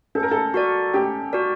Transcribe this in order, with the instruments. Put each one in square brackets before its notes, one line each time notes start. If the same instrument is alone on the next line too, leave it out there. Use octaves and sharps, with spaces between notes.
[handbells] C#4 [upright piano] A4
[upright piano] A#4
A4
[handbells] F#4 A#4 D5
[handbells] C#4 [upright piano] G4
[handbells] F#4 A#4 D5